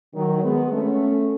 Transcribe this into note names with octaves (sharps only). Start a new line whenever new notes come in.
D#3 F#3
G#3 B3
A3 C#4